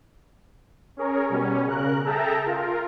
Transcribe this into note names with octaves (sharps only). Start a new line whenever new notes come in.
C#4 G#4 A#4 C#5
B2 G3 C#4
C#3 A#4 F#6
G#4 A4 E5 G5 A5 A#5
F4 A#4